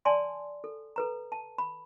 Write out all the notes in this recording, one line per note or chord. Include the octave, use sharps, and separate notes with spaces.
D5 G#5 A5 C6
A4
A4 B4 A#5
A5
B5